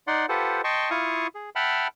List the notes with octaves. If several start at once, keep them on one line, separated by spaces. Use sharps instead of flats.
D#4 D5 F#5 C6
F4 G4 A4 B4 C5 F#5
D#5 G5 A5 C6 C#6
E4 F4 F5 C#6 D#6
G#4
E5 F#5 G5 A5 B5 F6